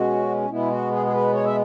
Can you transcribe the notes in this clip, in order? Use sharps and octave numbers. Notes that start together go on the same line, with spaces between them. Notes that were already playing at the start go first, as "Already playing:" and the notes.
Already playing: B2 G#3 C#4 F#4
B2 G#3 B3 E4
F#4
G#4
G#4
B4
C#5
E5